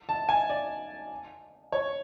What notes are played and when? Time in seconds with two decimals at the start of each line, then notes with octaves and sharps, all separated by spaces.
0.09 A5
0.29 G#5
0.50 D5
1.72 C#5